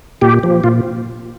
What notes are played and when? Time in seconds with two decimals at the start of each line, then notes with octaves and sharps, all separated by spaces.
0.21 A#2 G4
0.43 F3
0.64 A#2 F4